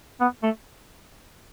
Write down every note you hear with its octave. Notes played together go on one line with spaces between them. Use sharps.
B3
A3